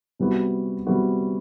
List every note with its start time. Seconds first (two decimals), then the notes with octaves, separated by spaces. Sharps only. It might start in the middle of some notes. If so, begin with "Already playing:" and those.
0.19 C3 G3 B3 F#4
0.87 C3 G3 B3 F#4